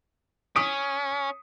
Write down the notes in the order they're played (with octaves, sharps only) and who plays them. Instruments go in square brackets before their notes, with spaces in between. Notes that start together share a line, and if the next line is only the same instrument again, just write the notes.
[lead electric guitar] C#4 [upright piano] D#6 B6 D7